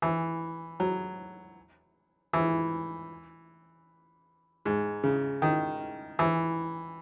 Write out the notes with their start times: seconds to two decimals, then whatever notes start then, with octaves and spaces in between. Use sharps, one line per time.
0.02 E3
0.80 F#3
2.33 E3
4.65 G#2
5.04 C#3
5.42 D#3
6.19 E3